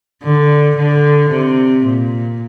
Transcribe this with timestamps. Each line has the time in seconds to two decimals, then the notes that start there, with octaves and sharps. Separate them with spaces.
0.23 D3
0.77 D3
1.30 C3
1.84 A#2